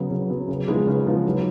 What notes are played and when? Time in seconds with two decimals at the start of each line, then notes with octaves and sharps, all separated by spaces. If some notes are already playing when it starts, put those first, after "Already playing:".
Already playing: C#3 F#3 B3
0.11 C#3
0.30 F#3 B3
0.48 C#3
0.67 F3 G#3 B3 D#4
0.87 C#3
1.06 F3 G#3 B3 D#4
1.25 F#3